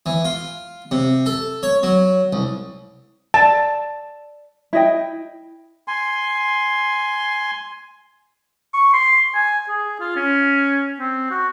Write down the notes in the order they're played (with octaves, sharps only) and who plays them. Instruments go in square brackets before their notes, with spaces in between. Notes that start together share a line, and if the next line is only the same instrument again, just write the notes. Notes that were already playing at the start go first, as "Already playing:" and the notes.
[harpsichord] E3
F4
C3
A4
C#5
F#3
C2
[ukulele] D5 [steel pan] A5
[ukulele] E4 D#5 G5
[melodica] G#5 C6
[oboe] C#6
C6
G#5
G#4
F4
C#4
C4
F#4